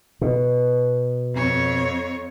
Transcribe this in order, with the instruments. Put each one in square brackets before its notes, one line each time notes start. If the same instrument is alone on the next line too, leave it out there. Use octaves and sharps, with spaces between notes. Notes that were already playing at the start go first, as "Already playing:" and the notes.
[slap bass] B2
[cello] F2 C#5